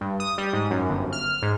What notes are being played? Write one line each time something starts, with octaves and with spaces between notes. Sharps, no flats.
G2
D#6
G3
G#2
F#2
G1
F6
G#2